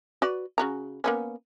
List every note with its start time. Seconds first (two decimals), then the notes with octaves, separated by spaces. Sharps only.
0.22 F#4 B4 D5
0.58 C#3 F#4 A#5
1.04 A#3 B3 C#4